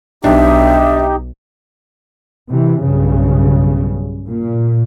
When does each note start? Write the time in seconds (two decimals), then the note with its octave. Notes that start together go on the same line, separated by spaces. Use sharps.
0.24 B1 D4 D#4 G4 E5
2.49 C3 E3
2.82 B1 G2 C#3
4.28 A#2